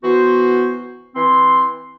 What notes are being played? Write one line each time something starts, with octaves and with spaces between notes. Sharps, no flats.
E3 B3 F#4 C5
E3 C4 C6